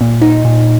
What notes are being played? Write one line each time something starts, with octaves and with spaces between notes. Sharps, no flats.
A#2
D#4
A#2